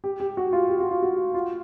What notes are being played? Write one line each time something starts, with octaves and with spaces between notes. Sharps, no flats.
G4
G4
F#4
F4
G4
F#4
F4
F#4
F4